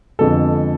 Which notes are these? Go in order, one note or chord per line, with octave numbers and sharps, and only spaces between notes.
F2 D3 G#3 B3 A4